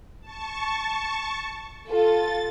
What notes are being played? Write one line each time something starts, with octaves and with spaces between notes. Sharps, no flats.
A5 C#6
F4 A4 A6